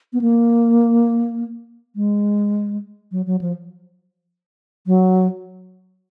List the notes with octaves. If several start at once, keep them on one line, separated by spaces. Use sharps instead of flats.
B3
A#3
G#3
F#3
F#3
F3
F#3